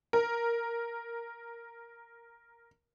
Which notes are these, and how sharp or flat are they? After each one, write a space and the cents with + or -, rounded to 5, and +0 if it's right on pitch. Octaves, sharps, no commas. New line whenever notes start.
A#4 +0